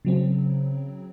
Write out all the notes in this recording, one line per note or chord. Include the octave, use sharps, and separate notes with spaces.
C#3 F#3 C4